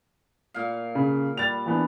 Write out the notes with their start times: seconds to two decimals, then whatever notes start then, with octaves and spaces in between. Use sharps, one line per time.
0.54 A#2 F5
0.95 C#3
1.37 G3 A6 F7
1.66 E3 B3 D4